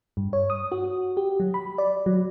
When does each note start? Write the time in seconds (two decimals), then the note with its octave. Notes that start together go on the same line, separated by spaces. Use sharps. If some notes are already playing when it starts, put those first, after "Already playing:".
0.17 G2
0.33 C#5
0.50 D#6
0.72 F#4
1.17 G4
1.40 F#3
1.54 B5
1.78 D5
2.06 F#3